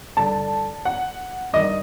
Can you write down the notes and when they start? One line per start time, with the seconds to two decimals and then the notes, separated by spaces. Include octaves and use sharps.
0.17 G2 D3 A5
0.85 F#5
1.53 G2 D#3 D#5